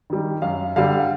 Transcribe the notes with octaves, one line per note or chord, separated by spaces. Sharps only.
D#3 G3
F#2 F5
D3 G3 F5